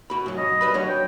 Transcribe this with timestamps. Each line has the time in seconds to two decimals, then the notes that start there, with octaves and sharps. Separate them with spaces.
0.10 F#4 B5
0.26 G#2 F#3
0.37 D#5
0.61 G3 B4 B5
0.74 F#3 D4 C#5
0.89 G5